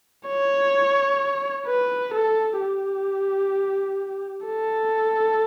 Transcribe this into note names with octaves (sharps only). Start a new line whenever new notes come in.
C#5
B4
A4
G4
A4